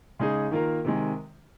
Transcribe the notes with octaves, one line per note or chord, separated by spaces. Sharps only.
C#3 G#3 D#4 G#4
D#3 A#3 F4 A#4
C3 D#3 G#3